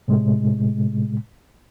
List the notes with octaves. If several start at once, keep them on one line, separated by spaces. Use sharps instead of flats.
A2 C3 G#3